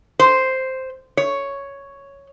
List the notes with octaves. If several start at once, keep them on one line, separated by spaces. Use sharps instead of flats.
C5
C#5